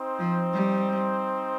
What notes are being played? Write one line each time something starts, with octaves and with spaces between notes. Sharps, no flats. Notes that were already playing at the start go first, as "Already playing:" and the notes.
Already playing: C4 D#4 C5
F3
G3